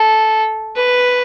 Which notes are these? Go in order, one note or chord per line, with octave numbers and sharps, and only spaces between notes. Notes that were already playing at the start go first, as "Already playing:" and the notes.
Already playing: A4
B4